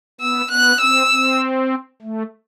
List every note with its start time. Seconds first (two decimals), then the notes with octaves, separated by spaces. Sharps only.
0.21 B3 E6
0.51 B3 F#6
0.81 C4 E6
1.11 C4
2.02 A3